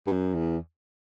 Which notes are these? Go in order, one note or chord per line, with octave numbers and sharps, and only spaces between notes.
G2
F#2
E2